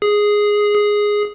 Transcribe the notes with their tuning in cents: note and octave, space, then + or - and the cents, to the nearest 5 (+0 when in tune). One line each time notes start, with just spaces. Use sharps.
G#4 +0
G#4 +0